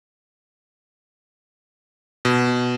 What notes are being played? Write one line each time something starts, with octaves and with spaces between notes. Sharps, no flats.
B2